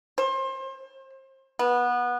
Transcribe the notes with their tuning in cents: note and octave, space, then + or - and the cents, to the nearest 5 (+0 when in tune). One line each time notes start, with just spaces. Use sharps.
C5 +30
B3 -20